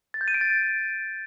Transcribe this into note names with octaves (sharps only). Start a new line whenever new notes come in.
A6
G6
D#7
D7
A6